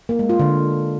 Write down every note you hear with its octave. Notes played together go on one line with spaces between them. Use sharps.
A#3
G#3
F4
D3